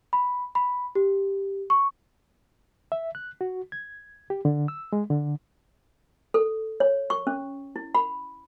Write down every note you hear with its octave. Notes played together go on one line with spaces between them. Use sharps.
B5
B5
G4
C#6
E5
F#6
F#4
G#6
G4
D3
E6
G#3
D3
A4
C#5
C#6
C#4
E4
B5